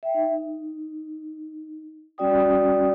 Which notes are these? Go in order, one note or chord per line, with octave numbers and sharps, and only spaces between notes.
E5 G5
D#4
G3 C#4 F#4 D5 G5 D#6